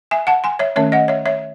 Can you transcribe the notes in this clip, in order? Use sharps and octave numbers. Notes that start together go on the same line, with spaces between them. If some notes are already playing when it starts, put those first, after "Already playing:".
E5 G#5
F#5 A5
G#5 C6
C#5 E5
D#3 A3 C#4 C#5 E5
D#5 F#5
C#5 E5
C#5 E5